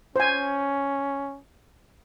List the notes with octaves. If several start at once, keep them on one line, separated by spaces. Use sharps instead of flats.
C#4 C5 G#5